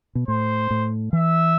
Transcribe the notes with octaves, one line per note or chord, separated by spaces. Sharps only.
B2
A2 C5
A2
E3 E5